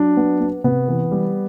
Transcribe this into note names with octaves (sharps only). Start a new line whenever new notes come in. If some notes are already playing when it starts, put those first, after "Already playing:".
Already playing: F#3 D4
B3
B3
C3 B3
E3
G3